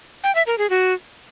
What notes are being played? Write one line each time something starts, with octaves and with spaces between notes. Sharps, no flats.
G5
E5
A#4
G#4
F#4